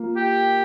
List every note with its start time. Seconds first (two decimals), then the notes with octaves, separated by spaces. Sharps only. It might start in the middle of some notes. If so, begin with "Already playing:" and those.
Already playing: A#3 F4
0.16 G4